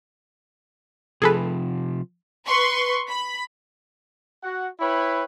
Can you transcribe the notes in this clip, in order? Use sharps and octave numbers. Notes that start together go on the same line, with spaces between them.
C3 F3 G#4 A4 B4
B4 C6 C#6
B5
F#4 F#5
E4 B4 C#5 G5 B5